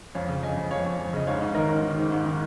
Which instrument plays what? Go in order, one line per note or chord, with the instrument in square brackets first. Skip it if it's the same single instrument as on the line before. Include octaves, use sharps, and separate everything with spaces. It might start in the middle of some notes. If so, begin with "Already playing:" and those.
[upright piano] F2 C#5 F5
C#3
C#3 D#5 G#5
F2
F2 C#5 F5
F2
F2
C#3 D#5
G#2 C#5 F5
G#2
D#3 A#4 D#5
G#2
D#3
G#2
G#2
D#3